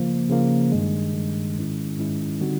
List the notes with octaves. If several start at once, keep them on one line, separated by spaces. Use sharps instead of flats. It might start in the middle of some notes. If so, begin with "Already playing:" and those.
Already playing: C#3 F3 A#3
C#3 F3 A#3
G2 D#3 G#3
G2 D#3 G#3
G#2 D#3 G#3 C#4 E4
G#2 D#3 G#3 C#4 E4
D3 G3 C4 D#4 F#4